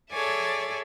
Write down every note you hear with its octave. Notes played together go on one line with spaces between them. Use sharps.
G#4 A4 C#5 D5 E5 G#5